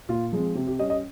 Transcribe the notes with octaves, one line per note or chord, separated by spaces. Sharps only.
A#2 F4
F3 G#3 C4
C3 G4
G4
G3 C#4 D#5
D#5